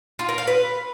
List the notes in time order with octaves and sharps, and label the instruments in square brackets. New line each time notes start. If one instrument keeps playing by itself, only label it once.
[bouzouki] F4
A#4
F5
B4